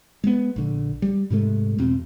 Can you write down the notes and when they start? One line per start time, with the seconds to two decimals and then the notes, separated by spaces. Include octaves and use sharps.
0.24 G#3 B3
0.56 A#1 D3
1.02 G3
1.30 G#2 C3 G#3 A3
1.78 E2 B2 C4